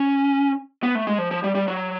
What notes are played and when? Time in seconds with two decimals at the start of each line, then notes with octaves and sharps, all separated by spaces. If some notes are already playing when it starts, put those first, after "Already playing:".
Already playing: C#4
0.83 B3
0.95 A3
1.07 G#3
1.19 F3
1.31 F3
1.44 G3
1.55 G3
1.68 F#3